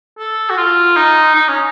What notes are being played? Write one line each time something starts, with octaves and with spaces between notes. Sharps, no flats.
A4
F#4
F4
D#4
D#4
C#4